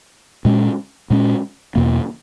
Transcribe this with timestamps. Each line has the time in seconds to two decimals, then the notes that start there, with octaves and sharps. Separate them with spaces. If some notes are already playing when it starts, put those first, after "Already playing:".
0.45 A#2 G#3 C#4
1.10 A#2 G#3 C#4
1.75 E2 B2 A#3